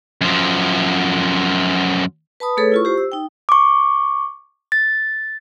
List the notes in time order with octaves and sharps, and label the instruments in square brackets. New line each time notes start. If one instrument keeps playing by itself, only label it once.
[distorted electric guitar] F#2 F3
[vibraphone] B4 A5 B5 D#6
A3 G#4 A4 B4 C#5
E4 F4 C#6
G4 C5
E6
D#4 G5
[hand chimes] C#6 D6
A6